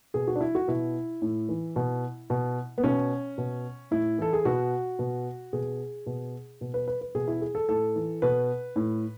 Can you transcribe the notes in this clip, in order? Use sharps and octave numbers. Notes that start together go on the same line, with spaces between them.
B2 G#4
F#4
D4
E4
F#4
B2 E4
A2
E3
B2
B2
B3
B2 C#4
B2
A2 E4
E3 A4
G#4
B2 F#4
B2
B2 G#4
B2
B2
B4
B4
B4
B2 G#4
E4
G#4
A4
A2 A4
E3
B2 B4
A2